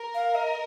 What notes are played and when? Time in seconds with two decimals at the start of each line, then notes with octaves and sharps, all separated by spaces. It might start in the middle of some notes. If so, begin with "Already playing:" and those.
Already playing: A#4
0.14 F5
0.35 D#5